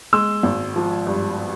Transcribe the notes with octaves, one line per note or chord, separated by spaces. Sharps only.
G#3 C6 E6
G#1
F3
G2